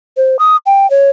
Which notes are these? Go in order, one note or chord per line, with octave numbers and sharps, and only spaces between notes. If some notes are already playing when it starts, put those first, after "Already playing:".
C5
D#6
G5
C#5